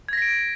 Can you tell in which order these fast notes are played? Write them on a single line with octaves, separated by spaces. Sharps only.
G#6 A#6 B6 D7